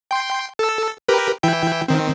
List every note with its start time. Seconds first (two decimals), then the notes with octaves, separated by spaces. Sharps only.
0.11 G5 C6
0.59 A4 E6
1.08 G4 A#4 B4
1.43 E3 E4 G5
1.88 D#3 C4